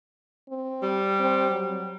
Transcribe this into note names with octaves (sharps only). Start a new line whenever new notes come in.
C4
G3
C4
F#3